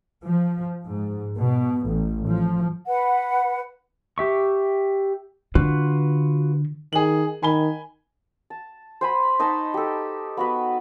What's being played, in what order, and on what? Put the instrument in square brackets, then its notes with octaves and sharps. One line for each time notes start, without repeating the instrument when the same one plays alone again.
[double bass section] F3
G#2
B2
A1
F3
[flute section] B4 F#5
[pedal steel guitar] G4 E5 C#6
[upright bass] D3 [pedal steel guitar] F4 F#4 B4
[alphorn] D#3 [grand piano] G#4 F#7
[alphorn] D#3 [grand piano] G#5 B5 G7
[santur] A5
C5 G#5 B5
D#4 D#5 A5 C#6
G4 A4
B3 F#4 B4